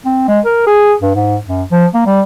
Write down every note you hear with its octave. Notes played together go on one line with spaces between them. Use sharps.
C4
G#3
A#4
G#4
G2
G#2
F#2
F3
A#3
G3